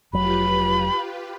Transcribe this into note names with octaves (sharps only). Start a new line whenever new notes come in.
F1 F#3 F4 G4 B4 B5